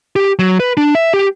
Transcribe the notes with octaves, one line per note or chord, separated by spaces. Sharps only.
G4
F#3
B4
D4
E5
G4